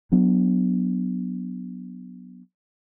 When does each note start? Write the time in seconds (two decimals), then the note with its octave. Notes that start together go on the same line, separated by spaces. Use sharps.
0.12 F#3 B3 D4